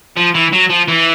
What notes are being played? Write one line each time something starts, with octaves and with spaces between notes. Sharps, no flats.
F3
E3
F#3
F3
E3